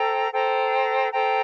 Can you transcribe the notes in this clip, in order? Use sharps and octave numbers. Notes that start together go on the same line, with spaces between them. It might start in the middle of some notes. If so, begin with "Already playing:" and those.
Already playing: A4 C5 G5 A#5
A4 C5 G5 A#5
A4 C5 G5 A#5